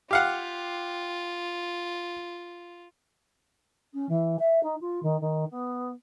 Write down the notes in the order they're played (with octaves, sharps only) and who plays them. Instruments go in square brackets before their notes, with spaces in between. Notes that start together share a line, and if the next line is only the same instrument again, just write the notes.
[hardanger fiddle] F4 [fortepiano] G4 F5 F#5
[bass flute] C#4
E3
E5
D#4
F4
D#3
D#3
B3